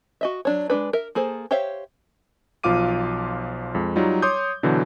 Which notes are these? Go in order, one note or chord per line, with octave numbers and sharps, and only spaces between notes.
F#4 D#5 E5
F#3 D4 C#5
G#3 A3 D4 B4
A#4 E5
A#3 G#4 A4 C5
G4 C5 C#5 E5 F5
B1 F3 F4 F5 D6 D#7
F2 G#3
F#3 G3 D#4 F4
C#5 C6 D6 D#6 G6
B2 D3 E3 F#3